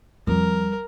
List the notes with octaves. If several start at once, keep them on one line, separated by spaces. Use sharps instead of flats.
F2 G3 A#4